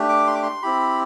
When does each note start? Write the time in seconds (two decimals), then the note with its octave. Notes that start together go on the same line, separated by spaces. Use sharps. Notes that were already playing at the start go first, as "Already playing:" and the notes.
Already playing: A3 D4 G4
0.09 D6
0.27 C6
0.35 D6
0.43 C6
0.62 C4 E4 G4 B5